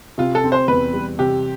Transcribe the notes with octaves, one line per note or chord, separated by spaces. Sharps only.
C3 F4
A4
C4
C5
E2 B4
G3
C3 G4